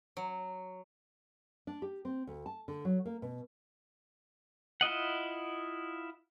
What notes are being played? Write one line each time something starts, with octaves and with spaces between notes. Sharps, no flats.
F#3
D4
G4
C4
D2
A5
D3
F#3
A#3
B2
E4 F4 D#5 F#5